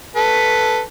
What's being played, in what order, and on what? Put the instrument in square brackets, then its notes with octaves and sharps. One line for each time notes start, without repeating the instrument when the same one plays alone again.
[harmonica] A4 B4